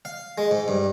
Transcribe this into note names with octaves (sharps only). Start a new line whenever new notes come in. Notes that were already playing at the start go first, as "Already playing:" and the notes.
F5
G#3
G#2
G2